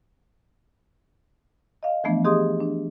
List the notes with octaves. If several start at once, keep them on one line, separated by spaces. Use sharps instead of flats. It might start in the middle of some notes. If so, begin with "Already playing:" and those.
D#5 F5
E3 F3 A3 B3 D4
G4 G#4 D#5 C6 D#6
D4